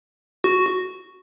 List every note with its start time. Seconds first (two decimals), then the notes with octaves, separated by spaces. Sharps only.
0.44 F#4